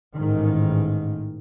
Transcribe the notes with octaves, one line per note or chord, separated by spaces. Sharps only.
A1 G#2 D#3